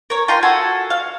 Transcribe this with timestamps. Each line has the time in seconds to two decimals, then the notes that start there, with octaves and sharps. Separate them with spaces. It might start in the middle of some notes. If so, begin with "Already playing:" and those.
0.10 A#4 C#5
0.28 F4 G5 A#5 C6
0.43 F4 F#4 A4 G#5
0.90 F5